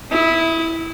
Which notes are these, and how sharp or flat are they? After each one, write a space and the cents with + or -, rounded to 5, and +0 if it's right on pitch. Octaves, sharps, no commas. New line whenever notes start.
E4 -5 D#6 +30